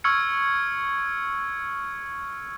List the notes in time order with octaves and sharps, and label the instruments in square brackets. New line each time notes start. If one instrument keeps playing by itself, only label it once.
[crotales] C#6 E6 F6 G#6 C#7